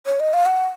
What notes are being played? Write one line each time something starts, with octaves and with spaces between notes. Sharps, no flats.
C#5
D#5
F5
F#5